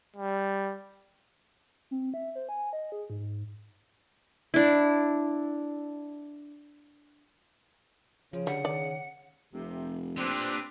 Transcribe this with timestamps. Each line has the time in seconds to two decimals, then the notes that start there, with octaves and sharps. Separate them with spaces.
0.16 G3
1.91 C4
2.14 E5
2.35 C5
2.49 G#5
2.73 D#5
2.92 G#4
3.10 G#2
4.54 D4 E4
8.33 C#3 F3
8.47 D3 G3 F#5
8.65 D#3 D5
9.54 F1 C3
10.17 A#2 C4 D4 G4 B4